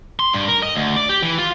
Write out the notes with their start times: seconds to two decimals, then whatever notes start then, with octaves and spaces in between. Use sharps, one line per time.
0.20 C6
0.33 G2
0.48 A#4
0.62 D#5
0.75 D2
0.96 D5
1.09 G4
1.22 E3
1.38 F4